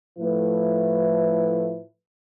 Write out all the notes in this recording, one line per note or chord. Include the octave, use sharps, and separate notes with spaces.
A2 F3 A3 E4 B4